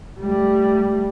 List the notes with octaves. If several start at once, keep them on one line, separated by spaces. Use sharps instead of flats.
G3 A3